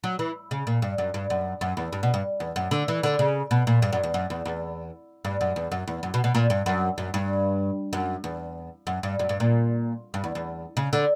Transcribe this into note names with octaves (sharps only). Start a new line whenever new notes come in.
F#3
E3
C#3
A#2
G2
F#2
G2
F#2
F#2
E2
G2
B2
G2
E2
F#2
D3
E3
D3
C#3
B2
A#2
G2
F#2
E2
F#2
E2
E2
G2
F#2
E2
F#2
E2
F#2
B2
B2
A#2
G2
F#2
F#2
G2
F#2
E2
F#2
G2
F#2
G2
A#2
G2
E2
E2
C#3
D3